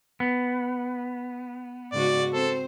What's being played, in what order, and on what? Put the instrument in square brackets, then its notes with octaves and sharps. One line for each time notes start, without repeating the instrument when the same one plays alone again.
[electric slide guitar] B3
[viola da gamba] G#2 C#3 F#4 [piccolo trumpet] D5
[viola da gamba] C4 C5 [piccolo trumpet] A4